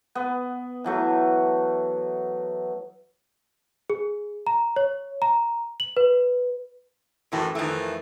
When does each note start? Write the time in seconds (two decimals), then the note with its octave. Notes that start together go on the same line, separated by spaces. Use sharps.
0.15 B3
0.84 E3 F#3 A3
3.90 G#4
4.47 A#5
4.76 C#5
5.22 A#5
5.80 F#7
5.97 B4
7.32 F#2 A2 C3 E3
7.55 F2 D#3 E3 A3